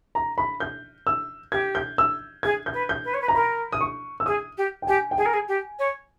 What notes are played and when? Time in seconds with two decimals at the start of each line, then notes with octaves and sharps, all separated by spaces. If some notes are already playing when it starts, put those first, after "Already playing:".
0.15 A#5
0.38 B5
0.60 G6
1.07 E6
1.52 G4 G#6
1.75 G6
1.98 E6
2.43 G#4 G#6
2.66 G6
2.73 B4
2.89 G6
3.04 B4
3.14 C#5
3.21 B4
3.28 A#5
3.35 A#4 B5
3.72 D#6
3.81 C#6
4.20 E6
4.26 G#4 D#6
4.57 G4
4.82 G5
4.87 G4 G#5
5.11 G5
5.17 G#4 G#5
5.25 A#4
5.33 G#4
5.48 G4
5.79 C#5